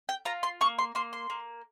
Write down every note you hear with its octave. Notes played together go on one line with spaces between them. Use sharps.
G5
F4 A#5
C6
A#3 C#6
C6
A#3 C6
C6
A#3